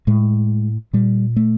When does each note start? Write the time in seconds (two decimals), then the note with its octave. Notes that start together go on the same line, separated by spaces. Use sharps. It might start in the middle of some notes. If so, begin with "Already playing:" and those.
0.07 A2 G#3
0.93 A#2 G3
1.36 A3